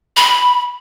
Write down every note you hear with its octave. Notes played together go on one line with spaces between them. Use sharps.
B5